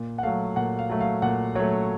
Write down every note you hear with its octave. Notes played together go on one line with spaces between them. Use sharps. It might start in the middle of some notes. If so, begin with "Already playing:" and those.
Already playing: A#2
F#5
F#3 A3 F5
A#2 F#5
F5
F#3 A3
F5
A#2 F#5
F#3 A3 C#5